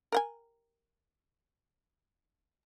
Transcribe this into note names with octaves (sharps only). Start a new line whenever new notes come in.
A#4 F#5 G#5